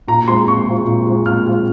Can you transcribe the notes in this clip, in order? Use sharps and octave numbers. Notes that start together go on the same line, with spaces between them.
A#2 A#5
G#3 C4 F4 C6
A#2 C#6
G#3 C4 F4
A#2
G#3 C4 F4
A#2 F6
G#3 C4 F4